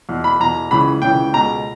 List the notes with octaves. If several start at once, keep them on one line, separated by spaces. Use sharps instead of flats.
E2 B2
B5
E2 B2 A#5
C#2 C#3 E3 B5
C#2 C#3 E3 G5
C#2 B2 A#5